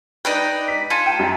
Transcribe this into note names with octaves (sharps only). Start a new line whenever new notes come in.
D#4 B4 D5 G5
B6
F4 G#4 A4
G5
F#2